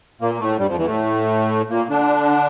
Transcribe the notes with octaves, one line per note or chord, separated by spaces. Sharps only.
A#2 A#3
A#3
A2 A3
G2 G3
F2 F3
E2 E3
A2 A3
A#2 A#3
D3 D4